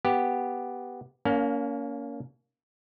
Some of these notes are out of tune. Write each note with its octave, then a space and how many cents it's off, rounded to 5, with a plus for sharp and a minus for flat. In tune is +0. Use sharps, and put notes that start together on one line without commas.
B3 +0 G4 +0
A#3 +0 C#4 +30 F5 +30